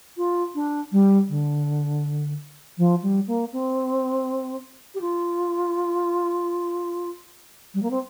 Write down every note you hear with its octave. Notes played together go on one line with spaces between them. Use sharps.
F4
D4
G3
D3
F3
G3
A#3
C4
G4
F4
G3
A#3
C4